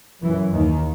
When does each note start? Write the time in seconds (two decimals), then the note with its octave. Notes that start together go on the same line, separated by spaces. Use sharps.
0.22 F#2 E3
0.53 D#2 D#3